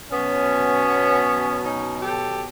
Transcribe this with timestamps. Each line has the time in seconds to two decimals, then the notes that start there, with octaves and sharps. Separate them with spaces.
0.11 B2 F#3 B3 C#4
1.63 C#4 D#4
2.02 G4 A4